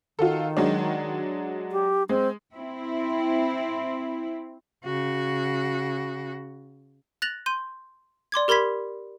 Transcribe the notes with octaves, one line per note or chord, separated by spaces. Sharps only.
D#3 F4 F#4 A4
F#3 G#3 D4
G4
G#3 C4
C4 E4
C#3 F#4
F#6 A6 A#6 F7 F#7
C6 G6 D#7
D5 C6 D6 G#6
G4 A#4 B5 C6 G#6 B6